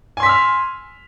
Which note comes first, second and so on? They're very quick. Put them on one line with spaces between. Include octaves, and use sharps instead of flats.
G#5 C6 B6 E6 F6